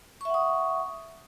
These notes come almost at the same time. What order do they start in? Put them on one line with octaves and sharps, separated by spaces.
C#6 E5 F#5 D#6